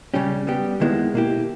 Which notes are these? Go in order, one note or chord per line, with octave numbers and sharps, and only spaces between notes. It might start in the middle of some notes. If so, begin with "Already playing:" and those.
C#3 G3 C#4 G4
G3 B3 G4
D#2 D#3 G#3 B3 E4
B2 A#3 E4 G4